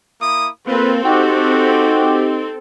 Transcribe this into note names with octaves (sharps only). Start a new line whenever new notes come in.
A#3 E4 D#6
A#3 C4 F4 A4 B4
D#4 F#4 G4